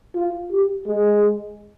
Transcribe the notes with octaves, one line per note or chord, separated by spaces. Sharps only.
F4
G4
G#3